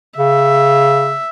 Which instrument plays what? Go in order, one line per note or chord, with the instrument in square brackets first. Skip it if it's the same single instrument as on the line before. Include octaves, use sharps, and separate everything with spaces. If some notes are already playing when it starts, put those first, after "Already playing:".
[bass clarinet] C#3 [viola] E5